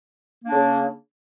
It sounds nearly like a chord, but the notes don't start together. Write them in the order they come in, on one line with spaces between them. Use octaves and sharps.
A#3 D4 C#3